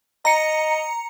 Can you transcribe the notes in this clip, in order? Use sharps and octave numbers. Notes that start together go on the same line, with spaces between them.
D#5 A#5 C#7